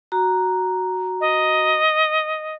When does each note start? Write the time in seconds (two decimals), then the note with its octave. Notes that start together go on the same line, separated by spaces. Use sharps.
0.12 F#4 A#5
1.21 D#5